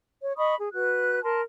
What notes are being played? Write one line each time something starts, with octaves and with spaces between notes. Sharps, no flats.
C#5
D#5 B5 C#6 D#6
G#4
F#4 B4 F#6
A#4 A5 C6